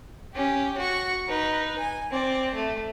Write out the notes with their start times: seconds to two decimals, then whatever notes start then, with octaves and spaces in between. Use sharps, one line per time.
0.33 C#4 G4
0.77 F#4 C#6
1.27 D#4 B4
1.78 G#5
2.11 C4 D5
2.54 A3